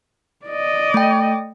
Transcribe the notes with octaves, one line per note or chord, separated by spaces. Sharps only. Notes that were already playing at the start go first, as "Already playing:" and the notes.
D5 D#5
A3 G5